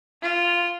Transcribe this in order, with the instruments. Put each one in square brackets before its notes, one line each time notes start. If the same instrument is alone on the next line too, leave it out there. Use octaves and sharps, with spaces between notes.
[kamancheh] F4